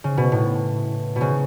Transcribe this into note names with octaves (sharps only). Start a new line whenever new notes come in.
C#3
B2
A2
B2
C#3